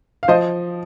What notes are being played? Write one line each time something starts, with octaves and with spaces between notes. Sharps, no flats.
F5
F3 C5 D#5